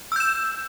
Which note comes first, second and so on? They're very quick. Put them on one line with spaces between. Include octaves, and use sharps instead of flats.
E6 G6 E7